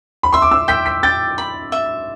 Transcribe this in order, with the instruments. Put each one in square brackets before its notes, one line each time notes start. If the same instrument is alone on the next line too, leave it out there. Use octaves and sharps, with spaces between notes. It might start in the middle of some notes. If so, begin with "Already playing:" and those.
[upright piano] B5
[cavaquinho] E5 [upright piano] C6
[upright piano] D6
E6
[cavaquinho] G5 [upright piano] B6
[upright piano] B6
[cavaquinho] G5 [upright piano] A6
[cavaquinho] B5
E5